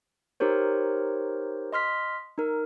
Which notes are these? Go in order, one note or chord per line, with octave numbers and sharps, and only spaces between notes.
D#4 G4 A#4 C5 C#5
D#5 C6 F6 B6
D#4 A#4